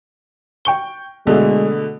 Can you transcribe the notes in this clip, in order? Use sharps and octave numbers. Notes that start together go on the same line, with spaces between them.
G5 C#6 G7
B2 D3 G#3 A3